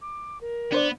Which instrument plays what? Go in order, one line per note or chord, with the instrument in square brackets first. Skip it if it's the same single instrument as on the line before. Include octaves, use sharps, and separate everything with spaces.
[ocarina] D6
A#4
[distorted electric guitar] B3 [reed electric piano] D4 C5 D5